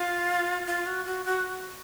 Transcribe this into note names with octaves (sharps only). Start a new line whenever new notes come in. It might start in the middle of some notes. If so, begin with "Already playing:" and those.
Already playing: F4
F4
F#4
F#4
F#4